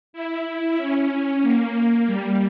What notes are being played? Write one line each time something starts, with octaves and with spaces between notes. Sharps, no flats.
E4
C#4
A#3
G3